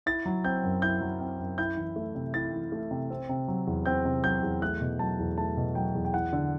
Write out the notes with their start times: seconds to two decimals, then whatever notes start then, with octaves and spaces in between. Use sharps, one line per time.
0.06 E4 A6
0.26 F#3
0.44 C4 G6
0.64 F#2
0.82 E4 G6
1.01 F#3
1.20 C4
1.39 F#2
1.58 E4 G6
1.77 E3
1.96 A3
2.15 C3
2.34 E4 A6
2.53 E3
2.72 A3
2.91 C3
3.10 C4
3.29 C3
3.48 F#3
3.67 E2
3.86 C4 G6
4.05 C3
4.24 F#3 G6
4.43 E2
4.62 A3 F#6
4.81 B2
4.99 F#3 A5
5.19 E2
5.38 A3 A5
5.57 B2
5.75 F#3 G5
5.95 E2
6.05 G5
6.14 E4 F#5
6.33 D3